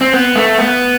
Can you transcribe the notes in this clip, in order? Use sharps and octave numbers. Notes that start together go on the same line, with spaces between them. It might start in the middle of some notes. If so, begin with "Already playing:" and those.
C4
B3
A3
B3